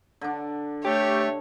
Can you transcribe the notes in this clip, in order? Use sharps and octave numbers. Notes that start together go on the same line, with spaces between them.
D3 D4
A3 G4 C#5